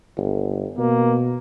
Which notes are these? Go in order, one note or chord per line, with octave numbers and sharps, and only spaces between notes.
G1
B2 A#3